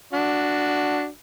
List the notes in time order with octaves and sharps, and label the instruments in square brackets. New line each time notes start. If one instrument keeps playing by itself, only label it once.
[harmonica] D4 F#4